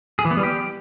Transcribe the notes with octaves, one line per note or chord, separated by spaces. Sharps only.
G#4
E3
B3
G3
G4